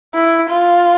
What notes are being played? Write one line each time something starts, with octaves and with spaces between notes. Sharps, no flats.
E4
F4